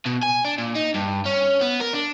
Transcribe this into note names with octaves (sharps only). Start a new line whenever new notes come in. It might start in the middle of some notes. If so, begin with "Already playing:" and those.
B2
G#5
D4
A#2
D#4
G2
C#4
B3
A#4
D4